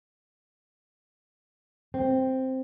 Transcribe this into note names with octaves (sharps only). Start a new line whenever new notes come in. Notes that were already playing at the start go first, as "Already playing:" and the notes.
C4